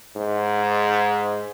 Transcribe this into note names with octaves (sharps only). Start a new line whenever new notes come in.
G#2